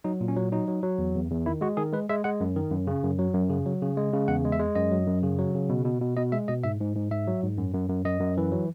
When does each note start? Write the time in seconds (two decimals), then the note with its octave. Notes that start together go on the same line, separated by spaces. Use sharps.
0.04 F#3 D#4
0.21 A#2
0.28 C#4
0.37 F#3
0.52 F#3 D#4
0.68 F#3
0.83 F#3
0.98 E2
1.15 E2
1.31 E2
1.46 D#3 E4
1.61 G#3 F#4
1.77 D#3 G#4
1.93 G#3 B4
2.09 G#3 E5
2.24 G#3 F#5
2.40 F#2
2.56 D#3
2.71 F#2
2.87 C#3
3.03 F#2
3.19 F#3
3.34 F#2
3.50 C#3
3.66 F#3
3.82 C#3
3.97 G#3
4.13 C#3
4.28 E2 F#5
4.45 G#3
4.52 E5
4.59 G#3
4.75 F#2 D#5
4.92 F#3
5.07 F#2
5.23 C#3
5.38 F#3
5.55 C#3
5.69 B2
5.85 B2
6.01 B2
6.17 B2 D#5
6.32 G#3 E5
6.48 B2 D#5
6.64 G#2 E5
6.80 G#2
6.96 G#2
7.11 G#2 E5
7.27 F#3
7.43 G#2
7.58 F#2
7.74 F#2
7.89 F#2
8.05 F#2 D#5
8.21 F#2
8.37 E3
8.52 F#3